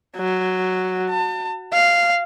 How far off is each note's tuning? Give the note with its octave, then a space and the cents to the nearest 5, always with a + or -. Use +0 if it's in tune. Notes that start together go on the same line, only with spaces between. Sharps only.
F#3 +0
A5 +35
F5 -10